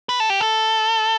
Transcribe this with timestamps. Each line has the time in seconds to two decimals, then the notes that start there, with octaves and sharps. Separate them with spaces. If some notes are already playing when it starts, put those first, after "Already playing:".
0.09 B4
0.20 A4
0.30 G4
0.40 A4